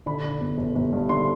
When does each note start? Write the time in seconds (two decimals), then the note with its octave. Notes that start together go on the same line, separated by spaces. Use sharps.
0.06 D3 B5
0.24 D3
0.41 G1
0.58 G1
0.75 G1
0.93 G2
1.09 D3 C6